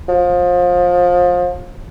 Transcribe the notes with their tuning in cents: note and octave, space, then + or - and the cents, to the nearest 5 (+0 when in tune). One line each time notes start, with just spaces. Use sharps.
F3 +25